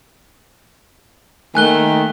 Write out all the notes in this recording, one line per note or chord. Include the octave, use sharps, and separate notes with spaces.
D#3 A3 A#3 G#5 F#6 G7